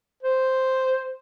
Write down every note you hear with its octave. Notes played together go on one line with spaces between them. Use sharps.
C5